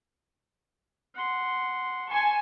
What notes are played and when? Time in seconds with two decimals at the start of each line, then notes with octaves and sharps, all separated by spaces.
1.14 F#5 C6
2.09 G#5 A5 C6 C#6